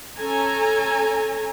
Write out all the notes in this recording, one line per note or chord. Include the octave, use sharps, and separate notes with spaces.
C#4 A4 G#5 A#5